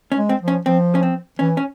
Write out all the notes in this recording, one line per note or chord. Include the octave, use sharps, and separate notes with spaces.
C#4
G#3
C4
F3
C#4
F3 C4
C#4
C4
E3 C#4
C#4